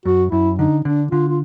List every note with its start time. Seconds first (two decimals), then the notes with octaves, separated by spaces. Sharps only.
0.05 F#2 F#4
0.32 F#2 E4
0.59 D3 D#4
0.85 D3 D4
1.11 D3 F4
1.28 F4